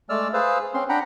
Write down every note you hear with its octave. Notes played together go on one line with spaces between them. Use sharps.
G#3 A3 D5 E6 F6
G#4 B4 C5 F5 E6
C4 C#4 C6
D4 F#5 G5 A#5 B5